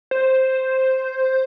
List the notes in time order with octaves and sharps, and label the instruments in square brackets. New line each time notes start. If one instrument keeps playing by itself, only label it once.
[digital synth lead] C5